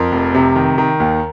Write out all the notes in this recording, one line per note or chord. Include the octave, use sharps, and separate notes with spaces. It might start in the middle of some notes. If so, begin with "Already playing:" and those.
Already playing: F2 A#4
F1
C3
D#3
D#3
D#2